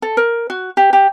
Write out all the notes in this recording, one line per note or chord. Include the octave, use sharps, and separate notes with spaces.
A4
A#4
F#4
G4
G4